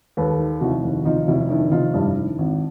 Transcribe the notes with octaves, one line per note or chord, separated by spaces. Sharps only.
D#2 A4 B4
D#3
F1 E4 F#4
D#2
F1 D#4 F4
F1 E4 F#4
D#3 D4 E4
F1 D#4 F4
G2 D4 E4
D#3
G#1